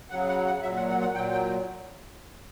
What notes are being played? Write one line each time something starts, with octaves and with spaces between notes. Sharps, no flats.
C#3 F#3 F#5
F#5
F#5
A#2 F#3 E5
F#5
F#5
F#5
A#2 F#3 G5
G5